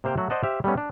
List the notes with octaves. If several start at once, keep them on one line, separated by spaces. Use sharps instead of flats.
C3 A#3 C5 F5 G5
F#3 A3 F#4
C5 D5 D#5 F#5 A5
G4 C5 E5 F5
G3 A3 B3 C#4
D4